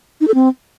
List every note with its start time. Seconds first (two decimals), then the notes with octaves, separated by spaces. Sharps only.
0.21 D#4
0.28 A4
0.34 C4